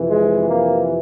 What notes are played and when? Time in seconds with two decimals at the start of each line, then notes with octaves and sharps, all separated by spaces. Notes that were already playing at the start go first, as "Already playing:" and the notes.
Already playing: F2 C3 E3
0.10 G#3
0.47 A#3